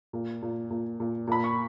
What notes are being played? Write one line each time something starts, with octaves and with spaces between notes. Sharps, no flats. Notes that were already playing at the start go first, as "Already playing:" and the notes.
A#2
A#2
A#2
A#2
A#2 B5
C#6